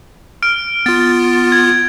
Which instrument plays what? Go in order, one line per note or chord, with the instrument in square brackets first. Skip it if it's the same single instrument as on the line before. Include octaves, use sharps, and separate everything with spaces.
[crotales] F6 D7
[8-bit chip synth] B3 F4 [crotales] A6
[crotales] G#6